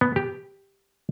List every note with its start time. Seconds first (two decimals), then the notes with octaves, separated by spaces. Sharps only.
0.01 B3
0.16 G4